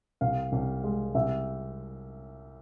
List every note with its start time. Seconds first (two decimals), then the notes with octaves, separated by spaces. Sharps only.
0.21 C2 F5
0.52 C2
0.84 G#3
1.15 C2 E5